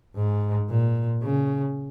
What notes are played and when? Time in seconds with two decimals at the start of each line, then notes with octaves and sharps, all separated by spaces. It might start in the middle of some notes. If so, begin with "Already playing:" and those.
0.16 G#2
0.69 A#2
1.23 C#3